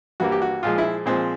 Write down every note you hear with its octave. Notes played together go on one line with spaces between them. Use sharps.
G2 E3 G3 A#3 F#4
G4
F#4
A#2 F3 G#3 F4
E4
A#2 F3 G#3 C4